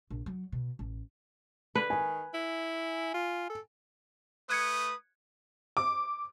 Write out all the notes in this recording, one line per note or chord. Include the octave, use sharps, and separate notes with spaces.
A#1
F#3
B2
A1
D3 B4
D#3 G#5
E4
F4
A4
A3 B4 D#6 F#6 G#6 C#7
D6